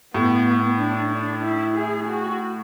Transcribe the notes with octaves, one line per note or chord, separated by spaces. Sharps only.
A2 B3
D4
D4
E4
G#4
F#4